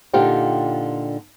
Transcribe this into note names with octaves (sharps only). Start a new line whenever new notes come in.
A#2 D3 D#4 F4 G4 G5